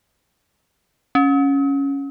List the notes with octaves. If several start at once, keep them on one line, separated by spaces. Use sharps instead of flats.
C#4